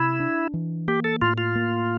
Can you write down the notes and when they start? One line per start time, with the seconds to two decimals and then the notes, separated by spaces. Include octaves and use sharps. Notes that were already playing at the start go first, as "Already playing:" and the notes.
Already playing: C3 E4
0.20 D4
0.54 E3
0.88 A#3 G4
1.04 A4
1.22 A2 F4
1.38 F4
1.55 A#3